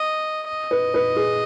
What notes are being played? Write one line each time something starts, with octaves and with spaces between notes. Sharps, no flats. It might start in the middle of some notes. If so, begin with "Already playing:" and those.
Already playing: D#5
D#5
B4
B4
G#4